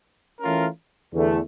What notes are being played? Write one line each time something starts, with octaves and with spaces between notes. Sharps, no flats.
E3 A3 C#4 F4 A#4
E2 D3 A3